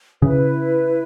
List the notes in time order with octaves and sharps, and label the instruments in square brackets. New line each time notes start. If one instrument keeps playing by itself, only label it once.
[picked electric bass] C#3 [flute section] E4 B4 E5